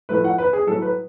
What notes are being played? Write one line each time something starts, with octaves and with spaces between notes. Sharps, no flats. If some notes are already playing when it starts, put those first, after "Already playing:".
A2 F3 A3 B4
F#5
B4
G#4
A2 F#3 A3 A4
B4